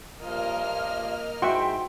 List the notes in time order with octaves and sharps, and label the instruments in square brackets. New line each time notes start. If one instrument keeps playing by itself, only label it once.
[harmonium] G2 F3 F4 [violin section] A#3 D#5 F6
[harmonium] G#2 G#3 E4 [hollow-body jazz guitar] F#4 [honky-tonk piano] E5 G5 C6